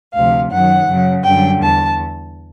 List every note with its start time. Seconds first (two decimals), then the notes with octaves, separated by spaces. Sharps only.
0.13 D2 C3 F3 F5
0.51 F#2 D#3 F#3 F#5
0.88 F#2 C#3 F#3
1.24 F#2 D3 G3 G5
1.62 E2 A5